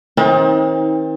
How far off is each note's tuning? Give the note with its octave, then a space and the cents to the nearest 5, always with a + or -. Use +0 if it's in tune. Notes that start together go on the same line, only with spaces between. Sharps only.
D#3 +40 C4 +40 D#4 +25